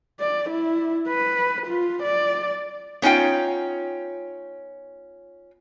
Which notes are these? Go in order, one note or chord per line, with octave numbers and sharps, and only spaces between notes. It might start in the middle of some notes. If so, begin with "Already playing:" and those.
D5
E4
B4
F4
D5
B3 C#4 D#4 F4 G5